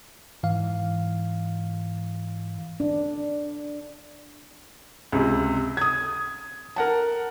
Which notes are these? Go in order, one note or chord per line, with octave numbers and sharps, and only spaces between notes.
G#2 E3 F5
D4
C#2 C3
D#6 G#6
A#4 F#5 A5